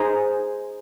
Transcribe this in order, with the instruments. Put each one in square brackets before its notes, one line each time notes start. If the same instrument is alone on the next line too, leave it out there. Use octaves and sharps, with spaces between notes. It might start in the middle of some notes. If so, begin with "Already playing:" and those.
Already playing: [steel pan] D#4 G#4 C5 A#5